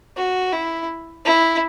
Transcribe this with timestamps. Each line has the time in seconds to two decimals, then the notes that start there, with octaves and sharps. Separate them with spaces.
0.17 F#4
0.52 E4
1.25 E4